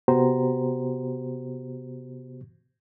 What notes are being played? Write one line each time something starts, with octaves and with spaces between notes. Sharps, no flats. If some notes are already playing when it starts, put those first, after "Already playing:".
C3 B3 F#4 G4 C5 A#5